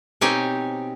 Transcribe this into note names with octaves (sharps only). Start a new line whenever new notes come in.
B2 C4 D#4 G4 C#5 G#5